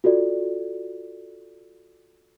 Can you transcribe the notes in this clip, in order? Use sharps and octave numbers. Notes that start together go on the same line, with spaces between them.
F4 F#4 A4 D5